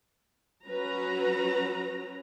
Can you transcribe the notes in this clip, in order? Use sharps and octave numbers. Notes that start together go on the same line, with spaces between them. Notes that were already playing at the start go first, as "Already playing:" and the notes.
F#3 C#4 F#4 B4 A#5